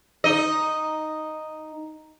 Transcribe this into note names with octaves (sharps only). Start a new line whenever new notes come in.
D#4 D#5